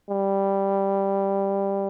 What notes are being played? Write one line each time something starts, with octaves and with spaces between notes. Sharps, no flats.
G3